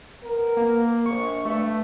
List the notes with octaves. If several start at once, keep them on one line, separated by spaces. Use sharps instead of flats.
B3 A#4
A#3
A#1 C#6
G2 A3